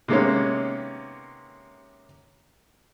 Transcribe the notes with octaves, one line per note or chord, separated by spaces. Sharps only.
C3 D#3 G#3 A#3 B3 C#4